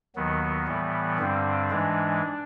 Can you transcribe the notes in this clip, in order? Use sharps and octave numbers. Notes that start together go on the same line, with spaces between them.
D#2 D#3 F#3 B3
A2 E3 G3
G2 D3 G3 C4
G#2 E3 G#3 D4